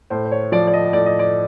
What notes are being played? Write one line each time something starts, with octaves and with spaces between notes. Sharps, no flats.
A2 C5
C5
C#5
F3 D5
D5
D#5
A2 D5
D#5
D5